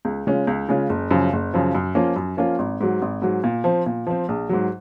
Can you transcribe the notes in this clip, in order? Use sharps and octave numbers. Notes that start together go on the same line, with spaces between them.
C#2
C#3 G#3 C#4 F4
C#2
C#3 G#3 C#4 F4
F#1
F#2 C#3 F3
F#1
F#2 C#3 F3
F#2
F3 A#3 C#4 F4
F#2
F3 A#3 C#4 F4
G#1
G#2 F#3
G#1
G#2 F#3
A#2
F3 C4
A#2
F3 C4
A#1
G#2 F#3